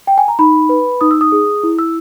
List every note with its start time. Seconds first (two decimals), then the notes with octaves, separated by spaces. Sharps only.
0.07 G5
0.18 G#5
0.28 A#5
0.39 D#4 B5
0.69 B4
1.01 D#4 D#6
1.11 E6
1.21 D#6
1.32 G#4
1.63 E4
1.79 E6